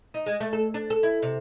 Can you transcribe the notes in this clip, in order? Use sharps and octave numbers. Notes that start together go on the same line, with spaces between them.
D#4
G#3
A3
A4
D4
A4
E4
C3